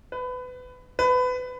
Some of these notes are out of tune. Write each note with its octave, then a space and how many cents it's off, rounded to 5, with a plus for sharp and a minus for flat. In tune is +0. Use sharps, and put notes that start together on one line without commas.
B4 +25
B4 +25